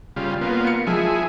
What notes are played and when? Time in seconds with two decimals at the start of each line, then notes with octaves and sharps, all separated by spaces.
0.16 C#3 G3 F4
0.41 A#3 B3 F4
0.67 C#7
0.87 F3 G#3 E4 G#4